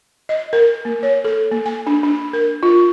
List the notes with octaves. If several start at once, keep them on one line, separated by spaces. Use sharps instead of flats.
D#5
A#4
A#3
C#5
A4
A#3
G#5
D4
D4
A#4
F4